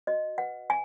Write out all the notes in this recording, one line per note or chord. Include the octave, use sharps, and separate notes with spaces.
F#4 D#5
B4 F#5
G#5